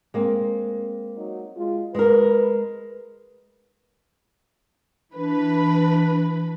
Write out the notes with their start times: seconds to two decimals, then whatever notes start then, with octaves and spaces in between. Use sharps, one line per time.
0.14 G#3 A#3 C4
1.17 F#3 D#4
1.56 G#3 F4
1.95 G#3 A#4 B4
5.15 E3 D4 B4